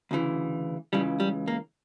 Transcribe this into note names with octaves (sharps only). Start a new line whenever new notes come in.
D2 C#3 E3
C#2 C#3 E3 G3
G3
A#3